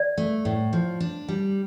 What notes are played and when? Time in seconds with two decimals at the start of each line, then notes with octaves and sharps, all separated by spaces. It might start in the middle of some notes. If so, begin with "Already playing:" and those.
Already playing: D5
0.18 A3
0.45 A2
0.73 F3
1.00 D4
1.28 G3